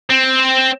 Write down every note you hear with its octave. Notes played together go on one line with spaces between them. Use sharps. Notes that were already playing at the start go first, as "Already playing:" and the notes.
C4